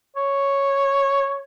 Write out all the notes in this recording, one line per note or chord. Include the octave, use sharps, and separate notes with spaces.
C#5